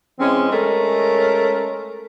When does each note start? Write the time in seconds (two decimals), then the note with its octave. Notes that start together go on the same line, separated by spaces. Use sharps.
0.20 E3 G#3 C4 C#4
0.50 G#3 A3 C#4 A#4